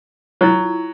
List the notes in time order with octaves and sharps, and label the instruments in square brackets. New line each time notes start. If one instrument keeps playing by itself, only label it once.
[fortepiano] F#3 [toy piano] E4 F4